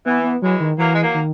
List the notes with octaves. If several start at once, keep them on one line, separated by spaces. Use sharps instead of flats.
E3 B3
B3
E3 F#3 G#3
D#3
E3 F#3 A#3
G#3
F#3 A#3
D#3